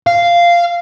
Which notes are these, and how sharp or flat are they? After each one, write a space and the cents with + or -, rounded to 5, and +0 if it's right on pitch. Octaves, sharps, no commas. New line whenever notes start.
F5 -10